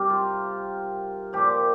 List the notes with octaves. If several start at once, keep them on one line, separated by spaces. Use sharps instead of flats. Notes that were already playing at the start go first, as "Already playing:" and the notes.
Already playing: C3 G3 G4 A#4
F4
A#2 F3 G4